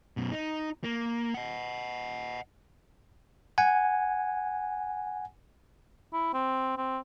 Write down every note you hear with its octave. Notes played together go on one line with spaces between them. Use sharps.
F#2 B2
D#4
A#3
D#5 F#5
F#5 G#5
E4
C4
C4